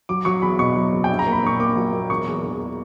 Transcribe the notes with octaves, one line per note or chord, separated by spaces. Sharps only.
F#3 D6
F#3 C#6
E2 B5
B2 C#6
F#3
F#1
G5
A#1
A#5
A#3
B5
A#2 C#6
A#3 D6
F#3
A#3
E1 C#6
E2
E1